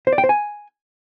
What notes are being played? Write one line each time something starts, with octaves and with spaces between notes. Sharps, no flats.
C5
D5
G5
C5
G#5